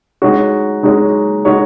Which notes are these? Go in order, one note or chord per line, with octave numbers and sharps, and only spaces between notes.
G#3 D#4 F#4 C#5
G#3 D#4 F#4 C#5
G#3 D#4 F#4 C#5